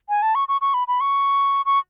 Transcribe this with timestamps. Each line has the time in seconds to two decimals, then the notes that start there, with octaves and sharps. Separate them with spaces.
0.09 G#5
0.22 A5
0.35 C#6
0.48 C#6
0.61 C#6
0.74 B5
0.88 B5
1.01 C#6
1.66 C#6